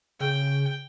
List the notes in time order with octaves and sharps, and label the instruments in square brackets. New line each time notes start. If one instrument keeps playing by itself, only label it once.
[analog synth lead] C#3 [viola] G5